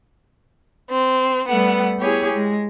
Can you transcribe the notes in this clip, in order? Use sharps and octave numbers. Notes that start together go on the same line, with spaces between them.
C4
G3 A3 B3 F#5
B3 E4 G4 G#4 C#5 G#5
G#3